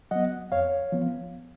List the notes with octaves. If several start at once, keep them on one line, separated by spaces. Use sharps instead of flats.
F#3 B3 D#5 F#5
F2 C#5 F5
F3 B3